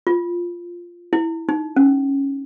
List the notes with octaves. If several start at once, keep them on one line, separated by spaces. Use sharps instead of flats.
F4
E4
D#4
C#4